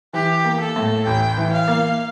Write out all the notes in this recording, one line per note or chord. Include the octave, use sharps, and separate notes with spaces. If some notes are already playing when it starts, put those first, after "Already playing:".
E3 G4
A#3
A4
A2
A1 G5
E3
F5
A#3